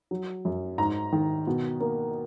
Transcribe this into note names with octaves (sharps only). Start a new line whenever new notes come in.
F#3
F#2
G#2 A#5
D#3
B2
A#3